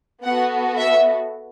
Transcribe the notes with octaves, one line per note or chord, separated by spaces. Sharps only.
B3 F#4 A4 F#5
E5